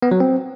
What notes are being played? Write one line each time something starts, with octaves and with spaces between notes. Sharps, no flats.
B3
F#3
C4